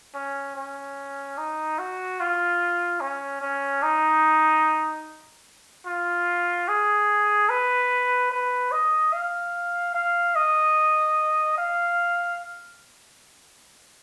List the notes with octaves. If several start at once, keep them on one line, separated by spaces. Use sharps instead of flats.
C#4
C#4
D#4
F#4
F4
C#4
C#4
D#4
F4
G#4
B4
B4
D#5
F5
F5
D#5
F5